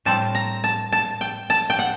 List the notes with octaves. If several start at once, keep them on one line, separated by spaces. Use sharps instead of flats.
A2 G3 C4 A5
A#5
A5
A5
G5
A5
G5
F#5